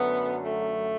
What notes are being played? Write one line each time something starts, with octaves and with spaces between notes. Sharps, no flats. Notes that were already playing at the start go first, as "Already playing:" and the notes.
Already playing: F#2 D3 F#3 A3 B3
A3